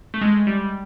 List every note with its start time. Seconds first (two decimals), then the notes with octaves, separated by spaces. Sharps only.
0.14 A3
0.22 G#3
0.47 G3